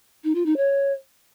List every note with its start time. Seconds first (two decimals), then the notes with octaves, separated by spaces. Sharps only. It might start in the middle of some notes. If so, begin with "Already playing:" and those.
0.24 D#4
0.35 F4
0.45 D#4
0.56 C#5